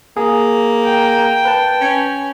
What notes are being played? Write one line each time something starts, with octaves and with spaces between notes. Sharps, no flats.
A#3 G#4
G5
B4 A5
C#4